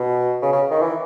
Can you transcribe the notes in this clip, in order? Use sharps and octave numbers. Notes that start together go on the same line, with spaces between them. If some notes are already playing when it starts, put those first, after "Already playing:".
Already playing: B2
C#3
C#3
D#3
E3